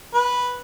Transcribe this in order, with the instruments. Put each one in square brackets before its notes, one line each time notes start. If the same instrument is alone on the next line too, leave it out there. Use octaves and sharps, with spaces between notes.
[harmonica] B4